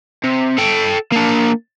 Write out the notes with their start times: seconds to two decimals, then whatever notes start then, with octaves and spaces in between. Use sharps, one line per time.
0.24 C3
0.58 A4 G5
1.12 A#3 D4